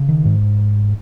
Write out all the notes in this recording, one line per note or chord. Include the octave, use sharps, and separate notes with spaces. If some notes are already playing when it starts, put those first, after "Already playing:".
Already playing: C#3
D#3
G#2